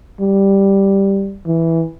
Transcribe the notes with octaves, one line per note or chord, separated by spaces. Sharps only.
G3
E3